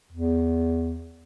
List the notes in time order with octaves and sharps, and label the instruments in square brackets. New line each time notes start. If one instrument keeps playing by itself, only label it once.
[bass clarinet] E2